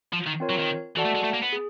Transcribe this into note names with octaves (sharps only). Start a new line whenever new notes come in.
F3
D#3
C4 F4 A#4 C#5
F#3
D#3
E3 F#4 A4 D5 F#5 A5
A3
G#3
A3
A#3
B3
G#4